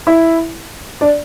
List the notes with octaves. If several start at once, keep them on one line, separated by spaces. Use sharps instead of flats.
E4 E5
D4 D5